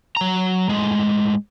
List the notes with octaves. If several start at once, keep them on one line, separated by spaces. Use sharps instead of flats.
F#3 A#5
A2 G#3